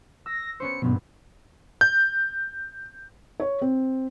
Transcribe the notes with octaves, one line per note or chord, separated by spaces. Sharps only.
E6 A#6
B3 C#4 C5 C#7
G#1 G2 B2 F#3
G6
C#5
C4